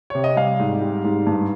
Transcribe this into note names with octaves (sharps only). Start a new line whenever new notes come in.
C3 C#5
D#5
G3 F5
G#2
G3
G#2
G2